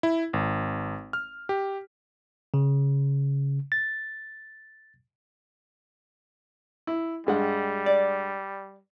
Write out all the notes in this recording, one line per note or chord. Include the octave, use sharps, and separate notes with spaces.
E4
G#1
F6
G4
C#3
A6
E4
G2 G3 G#3 F#5
D5